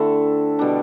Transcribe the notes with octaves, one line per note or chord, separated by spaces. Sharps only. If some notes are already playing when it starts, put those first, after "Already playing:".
Already playing: D3 A3 C4 E4 A4
B2 G3 D4